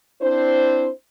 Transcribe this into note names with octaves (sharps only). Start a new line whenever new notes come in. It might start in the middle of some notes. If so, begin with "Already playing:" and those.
C4 D4 E4 C5